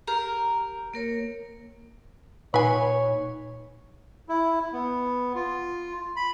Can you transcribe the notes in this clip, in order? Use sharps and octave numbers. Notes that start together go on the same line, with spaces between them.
G4 A#4
A#3 A#4 C#5
A#2 D#4 B4 C#5 G#5
E4
B3
F4
B5